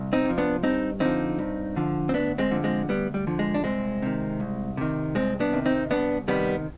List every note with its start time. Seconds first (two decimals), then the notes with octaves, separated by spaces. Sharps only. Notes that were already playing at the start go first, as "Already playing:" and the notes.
Already playing: C2
0.13 C4 D#4
0.25 C3 F3
0.38 B3 D4
0.63 G2 C4 D#4
1.00 D3 F3 C4 D#4
1.38 G2
1.76 D3 F3
2.09 C4
2.13 D2 B3 D4
2.38 G#3 C4
2.51 D3 F3
2.64 G#3 C4
2.89 D2 G3 B3
3.14 G3
3.27 D3 F3
3.39 G#3
3.54 D4
3.64 C2 G#3 C4
4.02 C3 D#3
4.40 C2
4.77 C3 D#3
5.15 C2 G#3 C4
5.40 B3 D4
5.53 C3 D#3
5.66 C4 D#4
5.90 C2 B3 D4
6.28 C3 D#3 G3 B3